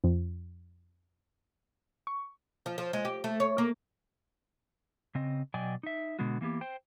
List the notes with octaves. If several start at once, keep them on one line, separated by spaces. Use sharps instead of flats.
F2
C#6
F3
F3
G#3
G4
A3
C#5
A#3
C#3 C4 D#5
B2 F#3 D5 D#5 G5 G#5
D#4 E5
B2 D3 G#3 B3 F#4
E3 A#3 B3 G4
C5 G5